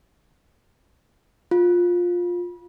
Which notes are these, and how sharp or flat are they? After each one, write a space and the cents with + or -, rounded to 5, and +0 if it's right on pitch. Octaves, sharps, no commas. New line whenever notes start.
F4 +15